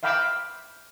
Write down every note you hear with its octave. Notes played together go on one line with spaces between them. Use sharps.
E5 F5 G5 B5 D6 E6